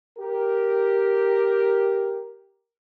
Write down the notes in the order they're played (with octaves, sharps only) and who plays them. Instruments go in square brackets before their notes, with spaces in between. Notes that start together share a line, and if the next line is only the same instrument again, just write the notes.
[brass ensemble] G4 A#4